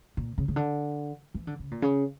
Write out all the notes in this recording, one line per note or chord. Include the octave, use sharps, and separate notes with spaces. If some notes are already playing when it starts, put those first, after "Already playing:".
A#2
C#3
C#3
D3
E3
D3
C#3
A#2
C#3